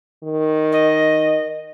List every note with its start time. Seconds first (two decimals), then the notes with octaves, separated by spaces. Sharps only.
0.23 D#3
0.72 D#5